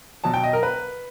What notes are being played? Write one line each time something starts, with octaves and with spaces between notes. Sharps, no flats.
B2 F#3 A5
G5
D#5
A#4
B4